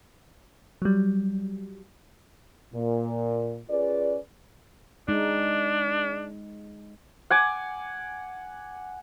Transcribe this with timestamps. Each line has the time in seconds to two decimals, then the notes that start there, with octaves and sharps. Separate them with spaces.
0.82 F#3 G3
2.74 A#2
3.70 C#4 F4 G#4 B4 D5
5.08 G#3 D4 D#4
7.30 F#5 G#5 D6